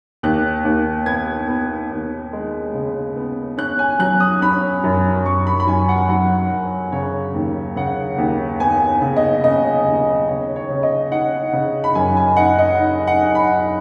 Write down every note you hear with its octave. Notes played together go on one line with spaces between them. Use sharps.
D#2 F#6
D#2
B3 G#6
B3
D#2
G#3
C#3
B3
C#4 F#6
G#5
F#3 F#6
D#6
C#4 B5
F#2
F#2 C#6
B5
B5
F#2 G#5
F#5
F#3 F#5
F#2
C#3 C#5
D#2
C#3 F#5
D#2
B3 G#5
C#3
D#5
C#3 D#5
D#2
C#3 C#5
C#5
C#3
D#5
D#4 F#5
C#3
B5
F#2 G#5
G#5
D#4 F#5
D#5
D#4
F#5
D#4
B5